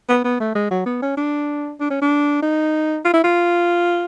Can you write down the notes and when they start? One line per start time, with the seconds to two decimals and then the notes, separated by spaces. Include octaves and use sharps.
0.09 B3
0.24 B3
0.40 A3
0.55 G#3
0.71 F#3
0.86 B3
1.02 C#4
1.17 D4
1.80 D4
1.90 C#4
2.02 D4
2.42 D#4
3.05 F4
3.14 E4
3.24 F4